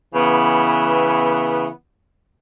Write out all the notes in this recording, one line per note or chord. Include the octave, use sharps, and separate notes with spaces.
C#3 E3 B3